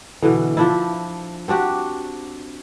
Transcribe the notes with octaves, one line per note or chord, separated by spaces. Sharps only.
B2 D3 E3
F3 D4 E4
C4 D4 F#4 G4